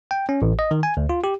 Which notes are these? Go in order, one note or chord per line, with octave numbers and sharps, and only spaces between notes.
G5
C#4
A1
D#5
D#3
G#5
D2
F4
G4